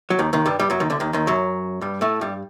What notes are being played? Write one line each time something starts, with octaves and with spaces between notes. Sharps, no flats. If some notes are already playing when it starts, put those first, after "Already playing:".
F#3
D#2 D#3
D#2 D#3
G2 G3
G2 G3
F#2 F#3
D#2 D#3
D2 D3
D#2 D#3
D#2 D#3
F#2 F#3
G2 G3
A2 A3
G2 G3